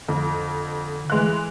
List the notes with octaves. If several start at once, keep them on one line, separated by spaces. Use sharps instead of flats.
F2 D3
E3 G#3 F#6